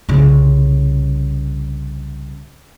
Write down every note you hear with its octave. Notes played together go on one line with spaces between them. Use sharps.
C2 C#3